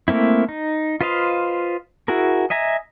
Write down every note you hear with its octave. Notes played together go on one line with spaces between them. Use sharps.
A3 A#3 C4 E4
D#4
F4 B4 C5 D#5 F5
E4 F#4 G#4 A#4
D#5 E5 G#5 A#5